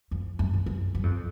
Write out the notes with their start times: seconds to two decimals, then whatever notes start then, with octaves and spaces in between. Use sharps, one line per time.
0.11 F2
0.39 F#2
0.54 G#2
0.66 F#2
0.95 F#2
1.03 F2